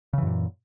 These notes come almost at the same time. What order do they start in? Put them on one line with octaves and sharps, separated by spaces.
C#3 E3 F#2 A#2